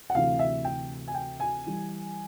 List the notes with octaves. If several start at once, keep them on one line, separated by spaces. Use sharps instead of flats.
F#5
D2 C3 E3 F5
E5
G5
G#5
G5
G#5
E3 G3